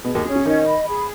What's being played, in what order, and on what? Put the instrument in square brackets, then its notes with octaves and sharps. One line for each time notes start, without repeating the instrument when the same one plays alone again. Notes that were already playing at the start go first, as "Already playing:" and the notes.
[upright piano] B2 B3 [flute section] G#4
[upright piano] D#2 D#3
[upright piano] C#3 [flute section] C#4
[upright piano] C#3
[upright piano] D#3 D#4 [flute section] D#5
[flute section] B5
G#4